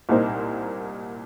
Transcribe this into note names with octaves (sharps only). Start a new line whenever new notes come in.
C2 A#2 A#3 D#4 C5